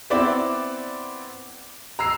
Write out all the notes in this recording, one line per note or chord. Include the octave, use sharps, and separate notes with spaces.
B3 C4 E4 D5
A#5 E6 C7